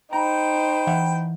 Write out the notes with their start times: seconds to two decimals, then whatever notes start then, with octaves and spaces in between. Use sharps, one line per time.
0.13 D#4 C5 G5 A#5 B5
0.87 E3 E5 F#5